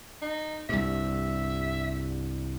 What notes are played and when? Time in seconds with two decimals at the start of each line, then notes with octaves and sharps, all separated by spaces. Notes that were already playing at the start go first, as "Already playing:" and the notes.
0.22 D#4
0.69 C2 G2 E5